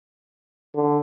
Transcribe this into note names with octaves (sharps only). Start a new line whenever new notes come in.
D3